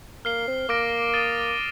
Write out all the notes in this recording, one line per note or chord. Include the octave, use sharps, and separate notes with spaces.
A#3 F6 C7 G7
C4
A#3 D6 F6 A#6 D7
D#6 A6 D#7 G7